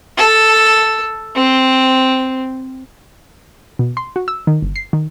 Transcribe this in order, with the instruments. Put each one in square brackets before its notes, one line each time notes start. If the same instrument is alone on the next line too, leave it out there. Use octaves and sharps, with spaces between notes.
[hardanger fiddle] A4
C4
[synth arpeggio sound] B2
C6
F#4
E6
D#3
G1
C7
D#3